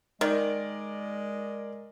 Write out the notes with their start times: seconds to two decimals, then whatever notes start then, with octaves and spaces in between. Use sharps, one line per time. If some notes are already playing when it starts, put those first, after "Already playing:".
0.21 D#3 G#3 A#4 D5